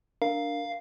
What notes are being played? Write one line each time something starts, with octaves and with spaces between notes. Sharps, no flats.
D4 A#4 F5